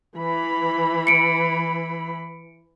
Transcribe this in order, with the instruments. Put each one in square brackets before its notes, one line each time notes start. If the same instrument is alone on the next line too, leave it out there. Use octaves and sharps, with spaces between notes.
[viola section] E3 B5
[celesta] C#7 D7